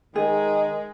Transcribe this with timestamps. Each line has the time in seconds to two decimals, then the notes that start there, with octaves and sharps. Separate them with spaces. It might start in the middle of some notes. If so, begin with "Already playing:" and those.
0.15 D#3 G#3 G#4